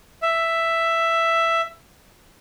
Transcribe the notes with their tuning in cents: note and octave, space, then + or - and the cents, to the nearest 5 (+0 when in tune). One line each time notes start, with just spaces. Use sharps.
E5 +5